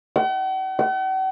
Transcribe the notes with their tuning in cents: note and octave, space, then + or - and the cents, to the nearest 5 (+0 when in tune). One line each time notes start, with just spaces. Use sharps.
F#5 +45
F#5 +45